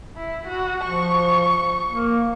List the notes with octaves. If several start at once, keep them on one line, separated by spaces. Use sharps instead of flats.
E4
F#4
F3 C#6
A#3